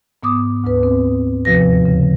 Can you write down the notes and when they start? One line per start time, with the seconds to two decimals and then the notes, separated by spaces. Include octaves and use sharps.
0.23 G#2 B3 D6 D#6
0.64 D2 G#2 B4
0.83 C4
1.45 D#2 C3 F3 F#4 B4 A#6
1.85 C#3